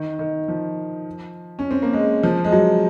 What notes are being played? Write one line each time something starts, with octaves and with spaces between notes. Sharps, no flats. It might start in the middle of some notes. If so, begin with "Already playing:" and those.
Already playing: D#3
D#3
F3
C#4
C4
A#3
G#3
F3
G#3
F#3